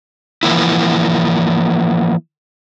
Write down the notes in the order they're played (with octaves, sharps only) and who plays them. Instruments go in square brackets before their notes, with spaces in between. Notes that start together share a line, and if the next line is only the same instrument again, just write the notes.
[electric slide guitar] E3 F3 A#3 E4